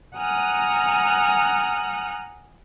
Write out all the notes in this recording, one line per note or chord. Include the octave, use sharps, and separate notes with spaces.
F#5 G#5 A#5 D#6 F6 F#6